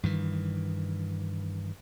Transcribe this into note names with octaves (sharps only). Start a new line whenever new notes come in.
G2 D#3 E3